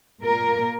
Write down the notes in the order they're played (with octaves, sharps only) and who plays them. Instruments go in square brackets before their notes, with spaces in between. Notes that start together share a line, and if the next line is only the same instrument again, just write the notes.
[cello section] A#2 A#3 A#4